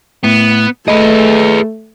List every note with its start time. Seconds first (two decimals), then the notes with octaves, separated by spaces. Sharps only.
0.24 A2 B3
0.88 A3 G#4 B4 D#5